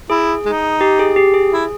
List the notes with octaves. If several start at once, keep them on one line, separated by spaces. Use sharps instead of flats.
E4 G#4
G#3 D#4
G4
G#4
G4
G#4
E4